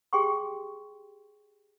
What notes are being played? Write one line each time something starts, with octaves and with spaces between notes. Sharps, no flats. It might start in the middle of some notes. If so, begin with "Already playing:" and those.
G4 G#4 G5 C6 C#6